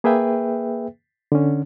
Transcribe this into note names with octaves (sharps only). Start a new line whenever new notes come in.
A#3 G#4 B4 E5 G5
D3 C#4